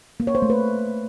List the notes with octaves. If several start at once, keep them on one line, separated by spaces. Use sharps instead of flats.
A#3
C#5
C5
A3
B4